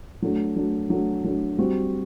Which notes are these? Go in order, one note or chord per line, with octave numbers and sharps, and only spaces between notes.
F#3 A3 D4
F#3 A3 D4
F#3 A3 D4
F#3 A3 D4
G3 C4 F#4